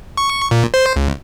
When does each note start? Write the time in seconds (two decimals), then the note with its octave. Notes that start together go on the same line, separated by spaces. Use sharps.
0.17 C#6
0.51 A#2
0.74 C5
0.96 C#2